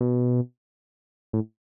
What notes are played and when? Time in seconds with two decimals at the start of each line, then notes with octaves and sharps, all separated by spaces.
0.01 B2
1.33 A2